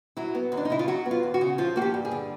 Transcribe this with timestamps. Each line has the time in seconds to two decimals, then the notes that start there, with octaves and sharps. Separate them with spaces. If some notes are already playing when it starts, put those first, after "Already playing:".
0.17 F#3 E4
0.35 B3
0.52 D#2
0.57 D4
0.65 D#4
0.70 C#3 E4
0.79 F4
0.88 F#3 F#4
1.06 B3
1.11 F4
1.23 D#2
1.34 F#4
1.41 C#3
1.58 F3 F4
1.76 A#3 F#4
1.82 G4
1.94 G2
2.05 G#4
2.11 D3